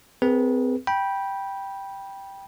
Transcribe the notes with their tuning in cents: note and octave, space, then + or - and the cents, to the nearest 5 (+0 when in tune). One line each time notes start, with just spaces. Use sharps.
C4 -35 G#4 +5 B4 -30
G5 +0 B5 -20